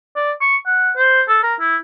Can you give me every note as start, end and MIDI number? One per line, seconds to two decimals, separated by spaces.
0.16 0.32 74
0.41 0.56 85
0.66 0.92 78
0.97 1.22 72
1.28 1.39 69
1.43 1.55 70
1.60 1.77 64